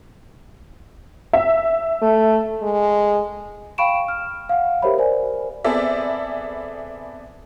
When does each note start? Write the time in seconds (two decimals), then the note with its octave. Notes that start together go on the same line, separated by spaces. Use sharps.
1.33 E5
2.02 A3
2.63 G#3
3.78 F5 G5 B5 C#6 D7 E7
4.08 F6
4.49 F5 F#5
4.82 G4 A#4 C5 C#5 E5 B5
4.98 A#4 C5 D5 G#5
5.64 B3 C4 G#4 A4 D5 E5